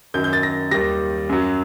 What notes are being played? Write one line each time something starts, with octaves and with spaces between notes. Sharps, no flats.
F#2 D#3 F#3 G6
G6
A6
A#6
D#2 D#3 G3 A#6
F#2 F#3